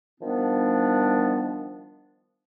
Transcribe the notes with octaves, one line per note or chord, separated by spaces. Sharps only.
D#3 F3 G3 B3 D4